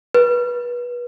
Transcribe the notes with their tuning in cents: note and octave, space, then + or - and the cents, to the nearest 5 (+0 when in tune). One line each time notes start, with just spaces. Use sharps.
B4 -30